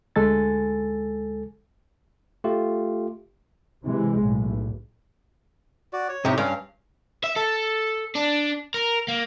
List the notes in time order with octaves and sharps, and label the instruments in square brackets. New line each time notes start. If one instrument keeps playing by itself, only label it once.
[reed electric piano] D2 G#3 A4 G#5 A6
[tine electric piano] A3 F4 G4
[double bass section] C3 E3 G#3
B1 A2
[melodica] F#4 D5
C#5
[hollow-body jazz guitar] A2 C3 [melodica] D#4 G4
[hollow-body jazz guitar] G2 [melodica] C#4 F5
[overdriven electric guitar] E5
A4
D4
A#4
A#3